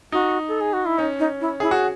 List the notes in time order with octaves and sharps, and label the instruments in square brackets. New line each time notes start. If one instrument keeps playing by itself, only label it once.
[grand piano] D#4 [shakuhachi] F#4
[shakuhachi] A4
G#4
F#4
E4
[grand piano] C#4 [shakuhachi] D#4
[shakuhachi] D#4
E4
[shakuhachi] E4 [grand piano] G#4
[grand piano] F#4